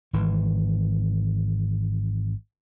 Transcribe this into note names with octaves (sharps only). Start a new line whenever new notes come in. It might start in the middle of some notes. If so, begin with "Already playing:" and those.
G#1 E3